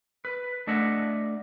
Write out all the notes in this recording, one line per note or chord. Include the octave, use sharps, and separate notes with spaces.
B4
A3 D4 D#5 E5 F#5